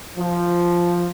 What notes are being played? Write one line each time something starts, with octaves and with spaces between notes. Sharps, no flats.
F3